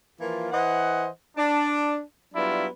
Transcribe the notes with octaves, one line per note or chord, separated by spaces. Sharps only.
E3 F3 A#3 F4
E3 C5 D#5 F#5
D4
F#3 G3 B3 D4 E4 F4